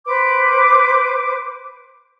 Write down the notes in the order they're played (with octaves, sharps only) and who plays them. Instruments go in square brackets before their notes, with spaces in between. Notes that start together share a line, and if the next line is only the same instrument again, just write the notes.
[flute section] B4 C5 D6